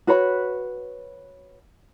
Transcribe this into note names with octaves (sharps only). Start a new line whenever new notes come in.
F#4 B4 C#5 B5